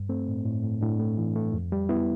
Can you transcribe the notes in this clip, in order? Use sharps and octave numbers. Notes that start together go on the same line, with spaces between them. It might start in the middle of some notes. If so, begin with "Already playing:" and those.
Already playing: G2
A3 C4
A2
A2
A2
A2 D4
A3
E3
A3
F2
G3
B3 E4